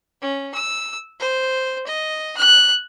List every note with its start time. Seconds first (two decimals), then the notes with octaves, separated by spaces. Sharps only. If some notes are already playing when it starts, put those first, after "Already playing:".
0.22 C#4
0.54 E6
1.20 C5
1.87 D#5
2.38 F#6